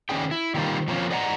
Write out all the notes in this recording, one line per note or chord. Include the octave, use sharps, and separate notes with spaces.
D#3 G#3 C#4 D4 G#4 G5
E4
D#3 G3 A#3 C4 F4
F3 A#3 C4 C#4 E4 F4
G#4 D5 D#5 F#5 G5 A#5